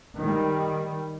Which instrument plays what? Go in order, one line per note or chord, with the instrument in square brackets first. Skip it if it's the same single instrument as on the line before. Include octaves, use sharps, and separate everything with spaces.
[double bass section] D#3 G3